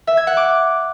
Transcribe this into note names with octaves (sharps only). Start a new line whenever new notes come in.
E5
G#6
F#5
D6